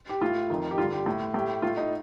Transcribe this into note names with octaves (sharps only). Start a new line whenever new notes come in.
G4
A2 F4
F2 D#3
G4
G2 D3 F4
G4
A2
A2 G4
A2 F4
D#4